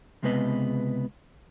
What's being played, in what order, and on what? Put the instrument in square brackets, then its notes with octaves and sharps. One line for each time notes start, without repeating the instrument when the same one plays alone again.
[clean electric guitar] C#2 C3 G#3 B3 B4 D#5